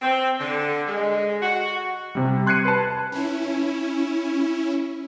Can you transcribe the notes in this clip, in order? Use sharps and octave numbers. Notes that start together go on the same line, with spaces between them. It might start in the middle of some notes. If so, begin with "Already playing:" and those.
C4
D3
G#3
F#4
C3 G3
C6 F#6 G#6 C7 C#7 D#7
B4 A5
C#4 E4